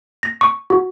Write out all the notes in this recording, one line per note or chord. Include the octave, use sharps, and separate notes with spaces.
A#6
C#6
F#4